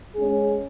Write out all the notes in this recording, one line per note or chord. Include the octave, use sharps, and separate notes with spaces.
G#3 C#4 G#4